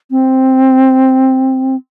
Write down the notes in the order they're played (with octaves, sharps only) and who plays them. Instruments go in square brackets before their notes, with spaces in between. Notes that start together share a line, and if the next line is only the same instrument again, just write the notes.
[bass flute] C4